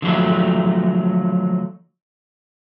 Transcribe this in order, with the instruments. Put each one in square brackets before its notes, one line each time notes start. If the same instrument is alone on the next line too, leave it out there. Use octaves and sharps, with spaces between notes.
[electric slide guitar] D3 F3 F#3 A3